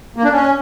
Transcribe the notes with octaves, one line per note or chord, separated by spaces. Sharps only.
A#3
D4
C#4